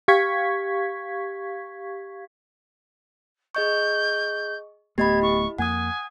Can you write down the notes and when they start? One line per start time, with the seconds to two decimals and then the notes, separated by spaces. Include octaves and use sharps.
0.08 G4 F5 C#6 G#6 B6
3.55 G#4 D#5 C#6 G6
4.98 D1 A3 B3 G4 D#5 B5 G#6
5.22 E4 C#6
5.58 F2 A#3 F#5 G#5 D#6